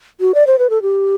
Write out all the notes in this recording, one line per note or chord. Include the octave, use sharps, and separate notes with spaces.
F#4
D5
C5
B4
A4
G4